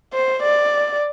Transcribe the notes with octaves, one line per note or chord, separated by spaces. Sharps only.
C5
D5